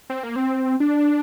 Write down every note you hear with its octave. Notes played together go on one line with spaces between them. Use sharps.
C4
A#3
C4
D4